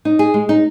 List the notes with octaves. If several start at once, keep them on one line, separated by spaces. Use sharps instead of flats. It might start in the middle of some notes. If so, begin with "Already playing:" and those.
D#4
G#4
G#3
D#4